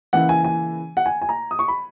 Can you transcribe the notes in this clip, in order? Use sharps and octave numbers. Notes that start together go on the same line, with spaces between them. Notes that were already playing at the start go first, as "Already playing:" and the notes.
C#3 E3 A#3 E4 F#5
G#5
G#5
F#5
G#5
G#5
A#5
D#6
C#6
B5